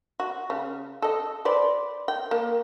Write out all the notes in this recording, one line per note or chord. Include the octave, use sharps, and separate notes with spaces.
F#4
C#3
A4 D#5
B4 C5 D5
G5
A#3